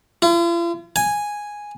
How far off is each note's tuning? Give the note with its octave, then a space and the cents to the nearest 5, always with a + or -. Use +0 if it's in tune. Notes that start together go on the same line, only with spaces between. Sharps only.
F4 -45
G#5 -5